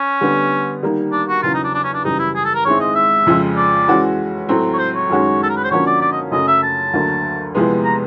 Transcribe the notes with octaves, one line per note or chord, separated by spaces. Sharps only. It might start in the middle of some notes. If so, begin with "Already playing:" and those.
Already playing: C#4
D3 G3 B3
D#3 G3 A#3
D4
F#4
E2 C#3 F#3 F4
D#4
D4
D4
C#4
D4
F#2 C#3 E3 G3 D#4
E4
G#4
A4
A#4
G#2 D#3 G#3 C4 E4 C#5
D#5
E5
F2 C#3 F3 G#3
D5
E3 G#3 C#4 F#4
A2 F#3 A3 C4
C#5
C5
C#5
F#2 D#3 G#3 C#4 F#4
A4
A#4
B4
C5
D3 F3 A#3 C#4 F#4 C#5
D5
D5
D#5
F#2 C#3 F#3 A3 C#4 D#5
E5
A5
D2 D3 F#3 A#3
E2 C3 F3 G#3 B3
A#5